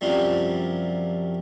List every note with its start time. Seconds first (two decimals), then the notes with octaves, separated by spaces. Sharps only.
0.01 F#2 C3 F3 G3